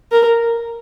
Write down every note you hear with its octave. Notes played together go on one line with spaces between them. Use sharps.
A#4